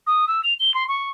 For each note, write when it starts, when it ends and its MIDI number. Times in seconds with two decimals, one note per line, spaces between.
0.06 0.25 87
0.27 0.40 88
0.43 0.53 101
0.59 0.74 103
0.74 0.84 84
0.88 1.10 85